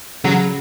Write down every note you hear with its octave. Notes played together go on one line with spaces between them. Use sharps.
C#3 F#3